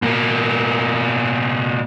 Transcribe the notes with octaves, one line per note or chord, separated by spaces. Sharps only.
B2 A#3